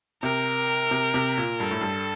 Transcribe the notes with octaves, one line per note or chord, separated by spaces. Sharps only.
C3 A#4
C3
C3
A#2
G2 A4
A2
G2